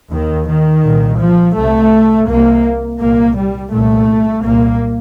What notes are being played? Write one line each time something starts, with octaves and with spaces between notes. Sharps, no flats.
D#2 D#3
D#3
C2 A#2
F3
C2 C3 A3
C2 C3 A#3
C2 A#2 A#3
G3
C2 A#2 A3
C2 A#2 A#3